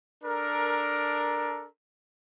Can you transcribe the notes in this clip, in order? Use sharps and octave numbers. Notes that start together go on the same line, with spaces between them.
D4 A4 A#4